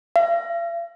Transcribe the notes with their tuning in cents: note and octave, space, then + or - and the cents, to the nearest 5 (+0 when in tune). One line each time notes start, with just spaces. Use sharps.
F5 -45